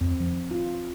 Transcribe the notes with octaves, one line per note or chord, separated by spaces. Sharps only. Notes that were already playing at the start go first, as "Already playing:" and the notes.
F2 C4
F3
F4